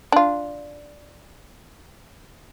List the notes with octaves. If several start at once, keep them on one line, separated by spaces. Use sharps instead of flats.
D4 F4